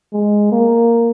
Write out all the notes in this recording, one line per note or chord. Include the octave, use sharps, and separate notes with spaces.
G#3
A#3